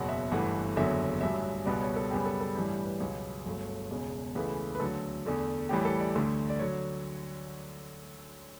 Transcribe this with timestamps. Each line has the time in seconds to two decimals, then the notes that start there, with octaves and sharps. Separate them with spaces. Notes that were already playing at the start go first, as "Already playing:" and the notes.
Already playing: F#1 E2 B2 F#3 F#5
0.09 E5
0.31 G1 G2 E3 A3 F#5
0.76 F#1 E2 D3 F#3 E5
1.21 A1 G2 F#3 E5
1.66 C#2 B2 G3 B3 D5
1.81 C#5
1.96 A4
2.11 F#2 C#3 G3 B3 G4
2.26 A4
2.41 A4
2.55 A1 G2 E3 G3
2.85 B4
3.00 C#2 B2 F#3 B3 C#5
3.46 G1 G2 F#3 A3
3.91 E1 E2 C#3
4.35 C#2 C#3 E3 A3 B4
4.75 B4
4.80 D2 D3 F#3 A4
5.25 E2 D3 A3
5.69 A1 A2 E3 G3 G4
5.85 A4
6.00 D5
6.15 D2 D3 A3
6.50 D5
6.59 D3 F#3 C#5